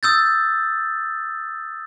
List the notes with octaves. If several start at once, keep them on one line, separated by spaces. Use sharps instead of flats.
D#6 E6 G6 A6